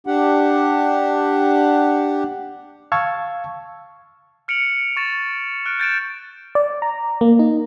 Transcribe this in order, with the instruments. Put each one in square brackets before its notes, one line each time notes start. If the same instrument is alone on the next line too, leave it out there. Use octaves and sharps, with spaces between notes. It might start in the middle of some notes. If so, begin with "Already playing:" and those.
[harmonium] D4 G4 F#5
[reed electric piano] F5 A5 C#6 E6 G#6
[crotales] F6 C#7 D7 F7 F#7
C#6 A6 E7
F6 F#6 D7
G6 A6 D7 E7
[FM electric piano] D5
A#5
A#3
D#4